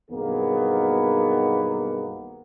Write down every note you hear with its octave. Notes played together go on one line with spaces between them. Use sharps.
B1 G2 D#3 A#3 B3 G#4